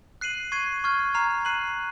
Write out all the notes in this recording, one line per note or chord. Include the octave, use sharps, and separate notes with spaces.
F#6 C7 D#7 F#7
C#6 G#6 C7 D#7
C#6 F6 G#6
A#5 F6 C7 F7
F#6 C7 D#7 F#7